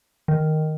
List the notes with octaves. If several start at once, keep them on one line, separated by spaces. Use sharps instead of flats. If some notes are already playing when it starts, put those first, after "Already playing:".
D#3